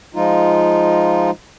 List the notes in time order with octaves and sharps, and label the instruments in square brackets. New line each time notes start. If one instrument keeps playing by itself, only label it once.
[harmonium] F3 G#3 D#4 F4